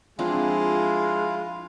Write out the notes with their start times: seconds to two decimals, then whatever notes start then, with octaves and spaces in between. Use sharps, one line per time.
0.19 F3 G#3 C4 D4 E4 F4 F5